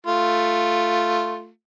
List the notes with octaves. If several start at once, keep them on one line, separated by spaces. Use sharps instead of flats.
A3 F4